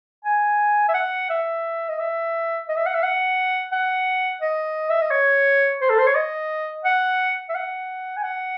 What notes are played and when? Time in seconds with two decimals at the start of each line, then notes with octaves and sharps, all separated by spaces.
0.25 G#5
0.88 E5
0.94 F#5
1.30 E5
1.89 D#5
1.99 E5
2.69 D#5
2.76 E5
2.86 F#5
2.94 E5
3.03 F#5
3.72 F#5
4.41 D#5
4.90 E5
5.01 D#5
5.11 C#5
5.81 C5
5.89 A4
5.98 C5
6.07 C#5
6.16 D#5
6.85 F#5
7.49 E5
7.55 F#5
8.17 G#5
8.23 F#5